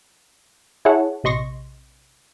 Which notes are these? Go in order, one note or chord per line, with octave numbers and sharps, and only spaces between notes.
E4 G#4 C#5 F#5 A5
A#1 C3 D#5 C6 C#6 A#6